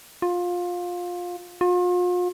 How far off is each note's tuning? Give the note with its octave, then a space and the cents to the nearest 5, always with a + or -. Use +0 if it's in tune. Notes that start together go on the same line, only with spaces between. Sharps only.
F4 +20
F4 +40